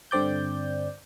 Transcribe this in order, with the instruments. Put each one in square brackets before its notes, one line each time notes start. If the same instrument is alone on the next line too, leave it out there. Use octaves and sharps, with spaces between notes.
[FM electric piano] G2 D3 C4 D5 G6